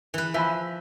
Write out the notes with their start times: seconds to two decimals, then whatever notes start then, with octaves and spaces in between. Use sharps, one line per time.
0.14 E3 B4
0.34 F3 E5 G#5 B5